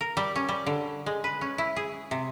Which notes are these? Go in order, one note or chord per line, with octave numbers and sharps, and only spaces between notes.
A#4
G3
C#4
G3
D3
G#3
B4
C#4
E4
G#4
C3